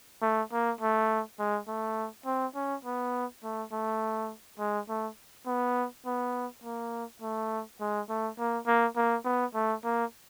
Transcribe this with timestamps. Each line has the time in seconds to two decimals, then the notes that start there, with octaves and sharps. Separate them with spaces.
0.22 A3
0.52 A#3
0.81 A3
1.39 G#3
1.68 A3
2.26 C4
2.55 C#4
2.85 B3
3.43 A3
3.72 A3
4.59 G#3
4.89 A3
5.46 B3
6.06 B3
6.64 A#3
7.22 A3
7.80 G#3
8.09 A3
8.38 A#3
8.67 A#3
8.96 A#3
9.25 B3
9.54 A3
9.84 A#3